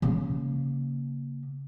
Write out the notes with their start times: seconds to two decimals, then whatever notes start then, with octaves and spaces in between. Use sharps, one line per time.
0.02 C#3 A#3